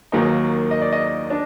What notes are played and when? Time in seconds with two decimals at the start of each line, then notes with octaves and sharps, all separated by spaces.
0.12 D#2 D#3 F#3 A#3 D#4
0.71 D#5
0.81 D5
0.92 D#5
1.30 D4